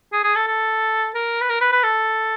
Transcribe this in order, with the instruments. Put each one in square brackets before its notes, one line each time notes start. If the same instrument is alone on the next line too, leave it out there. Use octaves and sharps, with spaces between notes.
[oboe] G#4
G#4
A4
A4
A#4
B4
A#4
B4
B4
A4